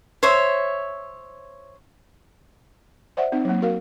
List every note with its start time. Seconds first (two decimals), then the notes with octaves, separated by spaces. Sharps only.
0.23 C5 C#5 E5
3.17 C5 D5 E5 F#5
3.32 C4 D#4
3.45 F#3 A#3
3.62 F#4 A#4 F5